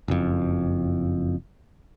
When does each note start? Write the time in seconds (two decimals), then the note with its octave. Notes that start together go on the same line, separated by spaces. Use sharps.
0.08 F#1 F2